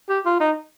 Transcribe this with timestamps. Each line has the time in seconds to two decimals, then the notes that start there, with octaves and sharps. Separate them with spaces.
0.09 G4
0.25 F4
0.40 D#4